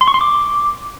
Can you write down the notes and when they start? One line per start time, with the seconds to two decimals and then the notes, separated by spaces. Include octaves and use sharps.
0.01 C6
0.08 C#6
0.14 C6
0.21 D6